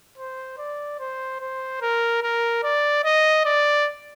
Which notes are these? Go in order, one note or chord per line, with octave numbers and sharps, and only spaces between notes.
C5
D5
C5
C5
A#4
A#4
D5
D#5
D5